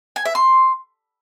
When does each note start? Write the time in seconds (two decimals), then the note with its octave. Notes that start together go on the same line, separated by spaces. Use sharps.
0.16 G#5
0.25 E5
0.35 C6